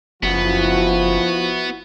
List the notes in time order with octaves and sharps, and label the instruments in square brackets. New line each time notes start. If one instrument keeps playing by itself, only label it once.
[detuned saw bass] F#1 [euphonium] F3 [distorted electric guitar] B3 [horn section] E4 F#4